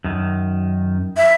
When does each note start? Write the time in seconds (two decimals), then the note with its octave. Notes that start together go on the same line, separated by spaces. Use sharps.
0.04 F#2 D#3
1.17 E5